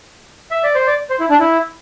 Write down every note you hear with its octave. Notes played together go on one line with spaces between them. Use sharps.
E5
D5
C5
D5
C5
E4
D4
E4